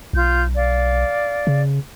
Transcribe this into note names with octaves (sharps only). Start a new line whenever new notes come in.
B1 F4 G6
D5 F5
C#3